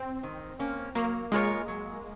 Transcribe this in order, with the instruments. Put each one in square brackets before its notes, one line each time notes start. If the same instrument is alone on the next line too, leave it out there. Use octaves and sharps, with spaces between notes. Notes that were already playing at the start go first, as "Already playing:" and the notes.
Already playing: [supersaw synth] C4
[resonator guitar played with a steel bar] D#3
A#3 C#4
[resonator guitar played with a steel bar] F#3 [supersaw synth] A#3
[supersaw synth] G#3 [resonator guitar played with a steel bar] A#3 F4 A#4 C#5
[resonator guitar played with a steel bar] F#3